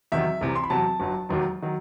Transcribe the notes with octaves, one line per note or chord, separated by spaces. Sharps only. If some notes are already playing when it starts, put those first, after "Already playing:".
E2 C3 D#3 F#3 E5
C2 C3 E3
C6
B5
E2 C3 F#3 A5
G1 G2 F#3
E1 D#2 D#3 F#3
D#3 F#3